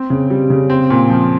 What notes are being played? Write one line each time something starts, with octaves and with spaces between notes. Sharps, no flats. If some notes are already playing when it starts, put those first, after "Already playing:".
Already playing: C4
C#3
G3
C#3
C4
A#2
F3